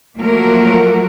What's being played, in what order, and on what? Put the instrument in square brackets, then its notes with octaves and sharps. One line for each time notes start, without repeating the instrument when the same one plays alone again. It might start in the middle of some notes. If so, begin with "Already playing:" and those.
[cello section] F3 F#3 A3 A#3 F#4 A#4